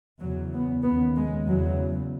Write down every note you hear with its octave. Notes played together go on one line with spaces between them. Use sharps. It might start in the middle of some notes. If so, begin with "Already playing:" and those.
E2 C#3 F#3
B3
D#2 C#3 B3
G#3
E2 C#3 F#3